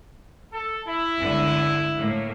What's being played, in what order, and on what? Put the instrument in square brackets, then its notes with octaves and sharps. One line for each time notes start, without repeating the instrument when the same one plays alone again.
[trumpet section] A4
E4
[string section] G1 C#2 D3
A2 A#3